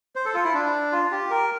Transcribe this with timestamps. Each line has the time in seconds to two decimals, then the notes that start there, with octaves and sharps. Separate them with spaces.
0.15 C5
0.25 A4
0.34 F4
0.44 E4
0.54 D4
0.92 F4
1.11 G4
1.30 A#4